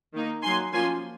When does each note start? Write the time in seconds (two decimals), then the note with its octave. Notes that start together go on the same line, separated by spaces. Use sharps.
0.14 D#3 A#3 D#4
0.43 F#3 A#3 D#4 G#5 C6
0.73 F3 A#3 C#4 G#5 C6